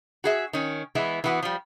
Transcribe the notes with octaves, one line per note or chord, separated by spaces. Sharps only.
F#4 G#4 E5
D#3 C#4
E3 G#3 B3 E4
E3 B3 F#4
F3 G3